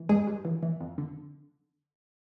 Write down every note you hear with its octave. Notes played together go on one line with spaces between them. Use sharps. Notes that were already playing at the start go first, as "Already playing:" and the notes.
Already playing: E3
G2 G#3 G#4
G2
E3
E3
F2
D3